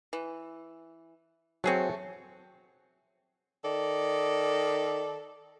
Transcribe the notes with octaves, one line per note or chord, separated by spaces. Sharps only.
E3
F#3 A3 C4 G#4 C#5
D#3 A4 D5